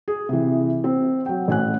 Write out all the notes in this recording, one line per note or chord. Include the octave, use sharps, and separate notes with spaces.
G#4
C3 E3
C4
F#3 G5
A1 G#5 F#6